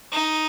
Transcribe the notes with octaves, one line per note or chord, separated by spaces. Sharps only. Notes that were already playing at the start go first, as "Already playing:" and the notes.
D#4